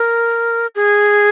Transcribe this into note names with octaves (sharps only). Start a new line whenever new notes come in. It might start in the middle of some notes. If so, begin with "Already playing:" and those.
Already playing: A#4
G#4